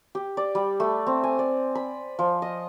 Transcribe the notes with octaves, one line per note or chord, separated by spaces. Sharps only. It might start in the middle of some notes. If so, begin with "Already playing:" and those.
G4
D5
G3
A3
C4
G#5
D5
B5
F3
D#5